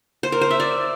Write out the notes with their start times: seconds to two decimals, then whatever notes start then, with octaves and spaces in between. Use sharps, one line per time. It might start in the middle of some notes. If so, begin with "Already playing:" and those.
0.23 C5
0.32 A#4
0.41 C5
0.51 E5
0.60 D5